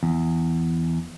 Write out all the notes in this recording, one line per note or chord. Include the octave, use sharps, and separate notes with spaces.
E2